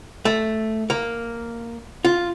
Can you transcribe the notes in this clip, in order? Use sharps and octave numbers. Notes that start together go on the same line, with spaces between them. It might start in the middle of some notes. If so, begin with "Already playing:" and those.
A3
A#3
F4